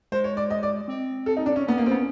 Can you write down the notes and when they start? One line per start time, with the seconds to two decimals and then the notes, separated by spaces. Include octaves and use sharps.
0.12 G#3 C5
0.24 C#5
0.37 D5
0.50 D#5
0.63 D5
0.88 C4
1.26 A4
1.37 D#4
1.46 D4
1.56 C#4
1.66 B3 C#4
1.78 A#3
1.86 C4
1.91 B3